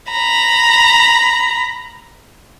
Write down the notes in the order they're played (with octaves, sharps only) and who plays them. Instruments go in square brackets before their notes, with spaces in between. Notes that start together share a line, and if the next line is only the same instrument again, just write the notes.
[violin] A#5 B5